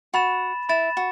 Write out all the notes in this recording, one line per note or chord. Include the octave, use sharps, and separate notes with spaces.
F#4 B5 A6 E7
E4 B5 A6 E7
F#4